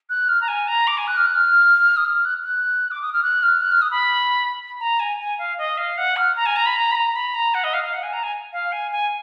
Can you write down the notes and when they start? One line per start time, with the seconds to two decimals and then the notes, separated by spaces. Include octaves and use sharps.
0.10 F#6
0.29 F6
0.41 A#5
0.48 G#5
0.68 A#5
0.87 D6
0.98 G#5
1.07 F#6
1.17 F6
1.26 F#6
1.35 F6
1.97 D#6
2.05 F6
2.25 F#6
2.43 F#6
2.91 D6
3.02 D#6
3.13 F6
3.23 F#6
3.43 F6
3.61 F#6
3.72 F6
3.82 D#6
3.91 B5
4.80 A#5
5.00 G#5
5.19 G#5
5.39 F5
5.58 D#5
5.78 F5
5.98 F#5
6.17 F6
6.36 A#5
6.46 G#5
6.56 A#5
6.66 B5
6.76 A#5
6.91 B5
6.95 A#5
7.16 B5
7.35 A#5
7.54 F#5
7.64 D#5
7.74 F5
7.84 F5
7.93 F#5
8.03 G#5
8.13 A#5
8.23 G#5
8.53 F5
8.72 G#5
8.92 G#5